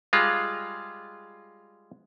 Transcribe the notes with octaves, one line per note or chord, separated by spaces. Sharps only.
G3 G#3 F4